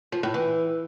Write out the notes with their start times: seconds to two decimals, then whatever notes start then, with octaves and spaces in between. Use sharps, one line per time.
0.12 F3
0.23 A2
0.34 E3